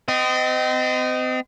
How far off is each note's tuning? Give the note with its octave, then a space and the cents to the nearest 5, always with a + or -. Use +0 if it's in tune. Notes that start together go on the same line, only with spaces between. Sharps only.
C4 -35 D#5 +0